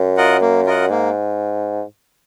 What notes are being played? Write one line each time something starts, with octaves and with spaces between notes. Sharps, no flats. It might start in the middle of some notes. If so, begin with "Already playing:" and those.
Already playing: F#2
F4 A#4 D#5 F#5
A#3
F4 A#4 D#5 F#5
G#2 A#3